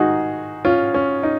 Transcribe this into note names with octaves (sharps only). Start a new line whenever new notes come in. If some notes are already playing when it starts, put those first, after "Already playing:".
Already playing: G#2 D#3 G#3 D#4 F#4 G#4
C#4 F4
C#4
D#4